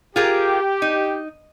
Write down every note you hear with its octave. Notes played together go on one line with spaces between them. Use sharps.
F4 G4 G#4 A#4
D#4